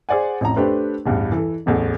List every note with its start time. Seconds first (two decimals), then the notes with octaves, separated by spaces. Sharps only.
0.09 G#4 C5 D5 F#5 G#5
0.41 A1 F2 A#5
0.56 A3 D4 G4 B4 C5
1.06 A1 E2 G2
1.32 E3 A4
1.66 D1 A1 E2 A3